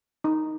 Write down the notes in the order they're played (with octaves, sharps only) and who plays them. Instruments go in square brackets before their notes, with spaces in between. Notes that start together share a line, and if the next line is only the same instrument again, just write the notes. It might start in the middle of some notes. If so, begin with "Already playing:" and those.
[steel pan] D#4